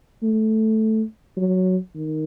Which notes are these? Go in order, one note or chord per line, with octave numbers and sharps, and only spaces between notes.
A3
F#3
D#3